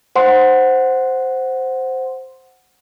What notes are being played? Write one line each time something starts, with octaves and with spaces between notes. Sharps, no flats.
C5 F#5 C6